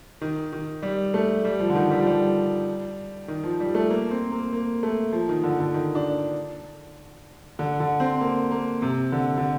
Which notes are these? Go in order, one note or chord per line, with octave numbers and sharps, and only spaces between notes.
D#3
D#3
G3
A3
G3
F3
D3
D#3
G3
F3
G3
D#3
F3
G3
A3
A#3
C4
A#3
A#3
A3
F3
D#3
D3
D3
D#3
D4
D3
D3
C4
A#3
A#3
C3
D3
D3